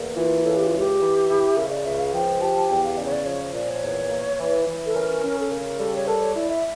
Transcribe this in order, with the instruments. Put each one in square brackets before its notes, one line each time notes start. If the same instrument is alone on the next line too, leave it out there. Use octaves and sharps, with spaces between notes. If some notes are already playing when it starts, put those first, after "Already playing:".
Already playing: [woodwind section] E2 A#3
[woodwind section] E3 [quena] F4
[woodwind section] C#3 [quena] A4
[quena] G4
F4
[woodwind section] C#2 [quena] G4
[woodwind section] E3
E4
[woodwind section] C#3 [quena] A#4
[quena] E5
D5
[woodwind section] C#2 [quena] E5
[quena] F5
[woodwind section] F3 [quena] G5
[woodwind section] G4 [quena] A5
[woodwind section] E2 [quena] G5
[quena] F5
[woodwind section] C#3 [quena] D5
[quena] C#5
D5
[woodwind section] F3 [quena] C#5
[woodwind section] A#2 [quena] D5
[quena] C#5
[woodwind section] E2
A#3
E3
E3
[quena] A4
[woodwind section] C#4 [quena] A#4
[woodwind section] C#4
[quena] A4
[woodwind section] C#3 [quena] A#4
[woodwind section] G3 [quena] A4
[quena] C#5
[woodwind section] A4 [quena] A#4
[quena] C#5
[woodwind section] E4 [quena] D5
[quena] E5